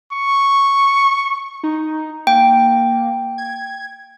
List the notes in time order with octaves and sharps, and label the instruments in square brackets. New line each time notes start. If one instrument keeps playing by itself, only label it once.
[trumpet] C#6
[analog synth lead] D#4
[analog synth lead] A#3 [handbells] G5
[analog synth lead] G#6